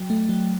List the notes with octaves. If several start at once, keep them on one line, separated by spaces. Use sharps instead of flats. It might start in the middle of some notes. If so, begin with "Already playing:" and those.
Already playing: F#3 G5
A3
F#3